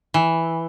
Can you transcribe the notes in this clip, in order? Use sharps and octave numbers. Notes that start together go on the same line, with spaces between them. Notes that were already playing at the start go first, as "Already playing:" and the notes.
E3